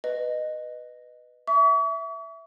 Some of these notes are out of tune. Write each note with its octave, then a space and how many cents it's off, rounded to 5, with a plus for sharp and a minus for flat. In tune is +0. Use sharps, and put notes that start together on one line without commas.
B4 +0 D#5 -15
E5 +0 C#6 +45